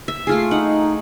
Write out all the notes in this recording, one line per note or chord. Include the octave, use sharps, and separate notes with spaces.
E5
A3 F4 G#4 C7
D#4 F#5